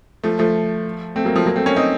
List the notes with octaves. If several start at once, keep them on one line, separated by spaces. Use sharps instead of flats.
F3 A3
F3 A3
A3 C4
F#3 A#3
F3 A3
F#3 A#3
A3 C4
A#3 C#4
C4 D#4